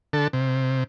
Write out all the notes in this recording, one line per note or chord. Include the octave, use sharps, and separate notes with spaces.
D3 A4
C3